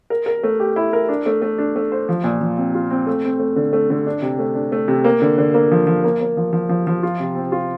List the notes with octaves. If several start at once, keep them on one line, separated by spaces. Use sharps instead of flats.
A#4
A#4
A3
G4
E4
A#4
D4
A3
A3
D4
A3
C5
F3
A#2
F3
C4
F4
C4
A3
C4
A3
D3
A3
D3
D4
C3
A3
D4
A3
C3
A#3
D3
D3
A#3
F3
F3
A#3
A#3
F3
F3
F3
F3
F4
C3
C4
F4